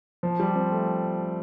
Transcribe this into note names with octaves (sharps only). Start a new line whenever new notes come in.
F3
G3
C4
A3